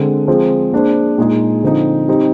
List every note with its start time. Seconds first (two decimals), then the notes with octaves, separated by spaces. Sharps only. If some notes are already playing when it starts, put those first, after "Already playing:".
Already playing: D3 G#3 C4
0.28 F3 G#3 C4
0.73 A#3 D4 G#4 C5
1.18 A#2 G#3 D#4 G#4
1.63 D3 F3 C4 D#4
2.08 G3 C4 D#4